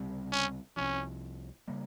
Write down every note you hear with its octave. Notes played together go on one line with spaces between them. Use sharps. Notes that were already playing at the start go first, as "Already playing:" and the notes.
Already playing: C#2 C3 G3 C4
C#4
C2 C3 F3 C#4
C#3 G3 A#3